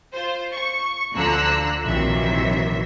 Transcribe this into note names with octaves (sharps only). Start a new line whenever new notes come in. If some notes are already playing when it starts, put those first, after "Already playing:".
F4 C5
C#6
D2 D3 F3 A#5 E6 F#6
A#1 C3 D#3 E3 F#3 E5